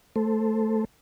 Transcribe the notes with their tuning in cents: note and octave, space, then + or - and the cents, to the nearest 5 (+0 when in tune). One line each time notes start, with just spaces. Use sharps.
A3 +0 A4 +0 C5 +0